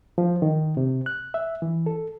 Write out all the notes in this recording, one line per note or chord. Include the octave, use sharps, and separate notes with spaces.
F3
D#3
C3
F#6
E5
E3
A4